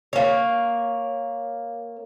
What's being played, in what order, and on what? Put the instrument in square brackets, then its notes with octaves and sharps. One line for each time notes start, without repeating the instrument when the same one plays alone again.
[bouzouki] A#3 C#5